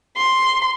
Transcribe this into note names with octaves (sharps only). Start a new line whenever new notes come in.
C6